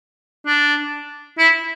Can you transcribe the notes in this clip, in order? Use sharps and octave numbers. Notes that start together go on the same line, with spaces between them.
D4
E4